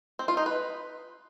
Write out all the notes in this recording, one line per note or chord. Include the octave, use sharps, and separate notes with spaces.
C4
F4
D#4
B4